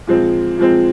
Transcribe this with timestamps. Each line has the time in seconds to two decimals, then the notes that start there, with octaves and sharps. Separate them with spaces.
0.07 A#2 F3 G#3 C4
0.58 A#2 F3 G#3 C4